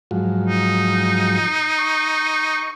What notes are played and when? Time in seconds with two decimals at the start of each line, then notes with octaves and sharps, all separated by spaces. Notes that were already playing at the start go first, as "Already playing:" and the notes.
0.11 G#2 F3 F#3
0.47 D#4
1.79 C#6